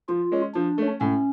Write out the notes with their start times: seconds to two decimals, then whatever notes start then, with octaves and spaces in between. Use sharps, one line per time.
0.08 F3 F4
0.32 G#3 C#4
0.55 F3 D4
0.78 A3 C#4
1.01 A2 C#4